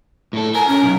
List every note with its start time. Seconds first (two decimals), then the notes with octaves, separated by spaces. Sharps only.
0.33 A2 A4
0.55 A#4 G#5
0.68 C#4
0.82 B1